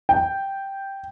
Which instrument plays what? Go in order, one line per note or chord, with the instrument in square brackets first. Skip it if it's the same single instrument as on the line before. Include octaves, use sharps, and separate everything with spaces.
[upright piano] G5